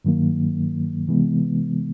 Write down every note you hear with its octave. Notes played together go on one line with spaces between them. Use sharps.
G2 D#3 F#3 A#3
C3 E3 G#3 B3